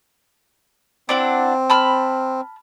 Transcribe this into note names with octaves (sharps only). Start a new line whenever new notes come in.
C4 D4 E4 F#5
A5 B5 F6